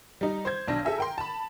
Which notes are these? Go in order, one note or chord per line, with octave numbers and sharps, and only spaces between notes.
G3 D#4
C5 G6 G#6
B1 D4 A#6
G#4 A4 E5 G#5
A#4 G5 C6
A5 B5